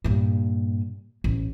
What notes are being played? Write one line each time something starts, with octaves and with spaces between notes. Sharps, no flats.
G2 A#2
A1